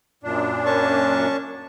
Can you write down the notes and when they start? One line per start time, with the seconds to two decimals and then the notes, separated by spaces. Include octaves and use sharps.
0.23 F#2 A#2 D4
0.66 C#4 A5 C#6